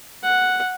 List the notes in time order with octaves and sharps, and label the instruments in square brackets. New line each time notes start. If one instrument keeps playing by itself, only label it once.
[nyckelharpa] F#5